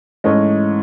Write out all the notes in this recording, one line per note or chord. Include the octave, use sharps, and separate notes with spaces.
G#2 E3 A3 C#4 D#5